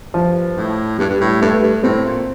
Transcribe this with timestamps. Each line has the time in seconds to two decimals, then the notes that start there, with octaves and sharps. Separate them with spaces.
0.14 G2 F3
0.57 A2
0.98 G2 G3
1.09 G2
1.21 A2
1.41 G2 A3
1.63 G2
1.83 A2 C4
2.06 A#2